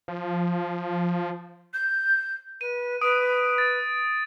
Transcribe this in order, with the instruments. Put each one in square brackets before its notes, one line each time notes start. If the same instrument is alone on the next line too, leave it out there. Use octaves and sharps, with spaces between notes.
[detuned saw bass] F3
[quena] G6
[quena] B4 [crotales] D#7
[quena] B4 [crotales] D#6 D7
[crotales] A6